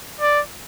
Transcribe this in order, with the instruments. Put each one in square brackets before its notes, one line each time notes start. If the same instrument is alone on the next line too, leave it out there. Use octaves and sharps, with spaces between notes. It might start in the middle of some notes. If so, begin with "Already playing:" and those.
[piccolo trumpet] D5